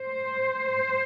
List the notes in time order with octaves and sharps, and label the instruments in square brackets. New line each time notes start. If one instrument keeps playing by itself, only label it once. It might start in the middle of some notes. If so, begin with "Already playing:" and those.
Already playing: [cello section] C5